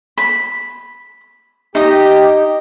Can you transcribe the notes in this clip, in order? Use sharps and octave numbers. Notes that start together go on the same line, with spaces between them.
B5
D#4 G4 D#5